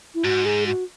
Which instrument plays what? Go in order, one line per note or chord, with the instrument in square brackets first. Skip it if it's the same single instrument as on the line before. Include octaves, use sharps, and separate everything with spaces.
[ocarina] E4
[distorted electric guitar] G#2 [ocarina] F#4
[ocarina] G#4
F#4